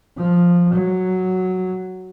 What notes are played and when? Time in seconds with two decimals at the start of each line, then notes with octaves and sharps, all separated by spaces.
0.17 F3
0.73 F#3